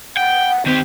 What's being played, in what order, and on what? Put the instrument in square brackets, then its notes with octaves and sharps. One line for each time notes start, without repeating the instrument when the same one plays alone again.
[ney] F#5 [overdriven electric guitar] G5
[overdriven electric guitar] D#3 G4 [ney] C4